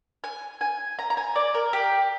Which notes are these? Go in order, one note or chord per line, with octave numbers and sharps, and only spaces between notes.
G#5
G#5
A#5
A#5
G#5
D5
A#4
G4